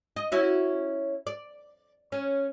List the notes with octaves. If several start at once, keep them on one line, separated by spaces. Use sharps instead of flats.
D#5
C#4 E4 F#4
D5
C#4